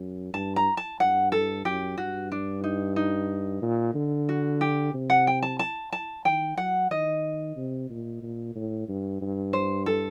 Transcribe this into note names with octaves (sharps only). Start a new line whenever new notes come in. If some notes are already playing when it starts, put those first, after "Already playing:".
Already playing: F#2
G2 A5
A#5
A5
G2 F#5
A4
F#2 G4
G2 F#4
D4
D#4
D#4
A#2
D3
F#4
G4
C3
F#5
G5
A5
A5
A5
D#3 G5
F#3 F#5
D#3 D#5
C3
A#2
A#2
A2
G2
G2
C5
A4